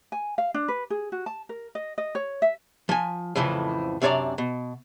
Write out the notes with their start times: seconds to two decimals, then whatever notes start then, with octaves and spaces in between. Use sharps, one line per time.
0.12 G#5
0.38 F5
0.54 D4
0.68 B4
0.90 G#4
1.12 F#4
1.26 A5
1.49 A#4
1.75 D#5
1.98 D#5
2.15 C#5
2.42 E5
2.89 F3 G#5
3.36 F2 A2 C#3 E3 F3
4.02 F#2 C3 D4 C#5 D5 A#5
4.38 B2